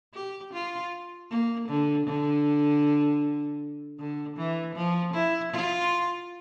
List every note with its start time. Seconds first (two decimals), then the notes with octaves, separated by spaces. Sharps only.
0.14 G4
0.53 F4
1.30 A#3
1.68 D3
2.06 D3
3.99 D3
4.37 E3
4.76 F3
5.14 E4
5.52 F4